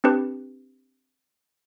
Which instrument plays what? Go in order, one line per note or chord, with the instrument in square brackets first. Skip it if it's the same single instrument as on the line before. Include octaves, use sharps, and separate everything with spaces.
[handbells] C4 D4 G4 B4